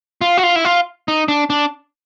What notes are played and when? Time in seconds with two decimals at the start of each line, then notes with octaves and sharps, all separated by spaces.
0.21 F4
0.38 F#4
0.43 F4
0.56 E4
0.65 F4
1.08 D#4
1.28 D4
1.50 D4